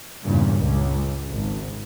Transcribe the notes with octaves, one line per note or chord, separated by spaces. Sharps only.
E2 G2 A#2 C#3
C#2
G#1